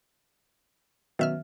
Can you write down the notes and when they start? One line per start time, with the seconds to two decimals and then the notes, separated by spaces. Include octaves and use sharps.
1.19 F#2 B2 D#3 F#3 E5 F6